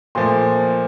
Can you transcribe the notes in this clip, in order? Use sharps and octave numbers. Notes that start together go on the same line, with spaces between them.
A#2 F3 A3 C6